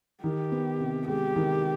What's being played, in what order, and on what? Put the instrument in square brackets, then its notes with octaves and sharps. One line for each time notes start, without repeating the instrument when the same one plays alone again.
[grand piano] D#3 [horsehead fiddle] G4
[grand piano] B3
C3
[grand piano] G#3 [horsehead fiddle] G4
[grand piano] D#3